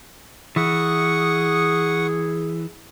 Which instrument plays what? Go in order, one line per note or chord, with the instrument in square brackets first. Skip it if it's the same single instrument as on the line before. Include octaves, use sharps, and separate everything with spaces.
[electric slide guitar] E3 [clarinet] G#4 [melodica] F#5 C#6 D#6